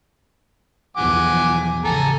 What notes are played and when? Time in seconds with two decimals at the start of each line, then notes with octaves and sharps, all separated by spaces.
0.97 B1 E2 F3 F#5 G#5 D6
1.84 A1 C#3 A4 G#5 A#5